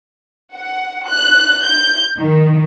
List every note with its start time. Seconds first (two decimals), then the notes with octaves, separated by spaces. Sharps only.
0.54 F#5
1.07 F#6
1.65 G6
2.19 D#3